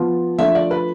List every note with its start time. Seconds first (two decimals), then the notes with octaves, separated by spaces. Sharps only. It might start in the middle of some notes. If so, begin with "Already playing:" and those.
Already playing: F3 B3 F4
0.38 F3 A3 D4 F4 E5
0.55 D5
0.71 B4